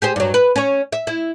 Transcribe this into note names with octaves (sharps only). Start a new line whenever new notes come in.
G4 G#4 C5
G2 F#3
B4
C#4 C#5
E5
E4